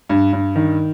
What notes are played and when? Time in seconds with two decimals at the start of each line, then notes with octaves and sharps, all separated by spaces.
0.09 G2
0.33 G2
0.56 D#3